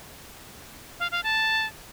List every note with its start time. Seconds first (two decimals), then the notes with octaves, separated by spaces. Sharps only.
0.99 F5
1.11 F5
1.23 A5